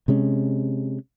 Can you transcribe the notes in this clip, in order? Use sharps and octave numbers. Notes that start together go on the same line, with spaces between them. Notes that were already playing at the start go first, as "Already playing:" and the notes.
C3 G#3 C#4